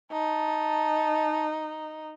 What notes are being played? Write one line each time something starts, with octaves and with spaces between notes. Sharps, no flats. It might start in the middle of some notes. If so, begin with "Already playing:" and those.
D#4 A5